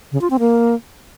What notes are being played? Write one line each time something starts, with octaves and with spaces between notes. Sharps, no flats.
C#3
F4
C4
A#3